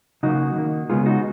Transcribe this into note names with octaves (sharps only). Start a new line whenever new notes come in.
C#3 F#3 A#3 D#4 F#4
D#3 A#3
C#3 G#3 B3 F4 G#4
D#4 F#4